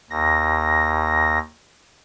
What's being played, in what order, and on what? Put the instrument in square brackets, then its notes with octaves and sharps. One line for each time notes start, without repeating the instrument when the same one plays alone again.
[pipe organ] D#2 A#6